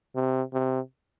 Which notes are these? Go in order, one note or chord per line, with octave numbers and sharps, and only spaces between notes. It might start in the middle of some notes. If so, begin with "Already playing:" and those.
C3
C3